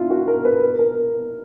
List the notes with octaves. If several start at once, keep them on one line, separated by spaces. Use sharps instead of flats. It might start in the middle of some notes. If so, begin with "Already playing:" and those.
Already playing: D4 E4 F4
F#4
A#4
B4
A#4
A#4